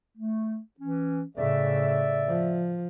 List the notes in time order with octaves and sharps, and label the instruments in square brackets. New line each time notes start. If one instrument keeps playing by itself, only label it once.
[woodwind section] A3
E3 C#4
[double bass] A2 C#3 [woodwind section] D5 E5
[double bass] F3